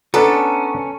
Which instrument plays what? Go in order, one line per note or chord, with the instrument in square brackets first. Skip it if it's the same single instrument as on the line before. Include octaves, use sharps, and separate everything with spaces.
[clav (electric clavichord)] B3 D4 [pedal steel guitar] C#4 [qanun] A4 [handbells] A#5